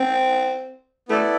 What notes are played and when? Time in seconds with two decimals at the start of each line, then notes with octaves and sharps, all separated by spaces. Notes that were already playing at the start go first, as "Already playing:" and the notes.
Already playing: C4
1.08 A3 B3 E4 A4 D5